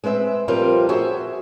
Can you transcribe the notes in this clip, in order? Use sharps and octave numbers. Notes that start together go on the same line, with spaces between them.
G#3 C4 B4 E5
F3 G3 C4 F4 A#4 B4
F#4 G#4 C5 E5